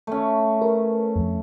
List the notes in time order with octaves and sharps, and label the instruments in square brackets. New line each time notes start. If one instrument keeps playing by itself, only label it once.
[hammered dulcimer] A3 C#4
[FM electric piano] A#4 B4
F2